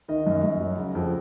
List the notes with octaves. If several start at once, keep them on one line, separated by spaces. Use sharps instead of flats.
D#3 D#5
F#2
F#2
F#3
C#3
F2